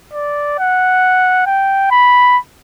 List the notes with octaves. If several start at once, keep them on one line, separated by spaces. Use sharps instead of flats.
D5
F#5
G5
B5